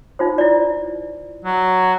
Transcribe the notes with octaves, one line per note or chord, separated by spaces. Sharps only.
D#4 F4 C5
E4 D5
F#3